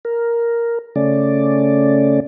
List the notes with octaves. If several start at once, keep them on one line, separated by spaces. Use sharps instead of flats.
A#4
C#3 A3 C#4 D5